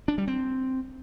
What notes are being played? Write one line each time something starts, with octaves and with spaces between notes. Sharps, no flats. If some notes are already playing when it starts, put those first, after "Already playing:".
D4
G3
C4